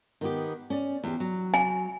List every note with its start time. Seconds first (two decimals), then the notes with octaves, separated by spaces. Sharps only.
0.21 D#3 B3 G4
0.70 C#4 D5
1.04 E2 G4
1.20 F#3
1.54 G#5